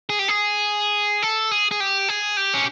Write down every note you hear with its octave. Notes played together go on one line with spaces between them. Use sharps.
G#4
G4
G#4
A4
G#4
G#4
G4
G#4
G4
C#4